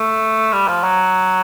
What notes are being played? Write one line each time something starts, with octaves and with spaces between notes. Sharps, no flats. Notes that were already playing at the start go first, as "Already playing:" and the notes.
Already playing: A3
G3
F3
F#3